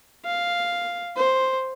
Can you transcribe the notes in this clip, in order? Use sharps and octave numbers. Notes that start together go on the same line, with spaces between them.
F5
C5